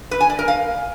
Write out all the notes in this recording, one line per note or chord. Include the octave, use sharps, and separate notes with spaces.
B4
G#5
D5
A#4
F5